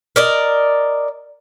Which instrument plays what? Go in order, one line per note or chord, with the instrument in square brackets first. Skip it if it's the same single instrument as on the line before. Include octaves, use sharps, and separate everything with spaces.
[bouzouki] A#4 D5 D#5